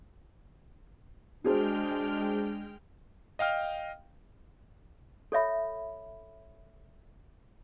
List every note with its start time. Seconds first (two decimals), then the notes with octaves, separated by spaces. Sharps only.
1.44 G#3 D4 F#4 G#4 C5 G5 F6
3.39 D#5 F5 G5 F6
5.32 A4 C#5 E5 B5